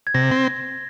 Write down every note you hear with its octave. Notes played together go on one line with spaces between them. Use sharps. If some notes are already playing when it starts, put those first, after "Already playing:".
G#6
C3 A#6
C4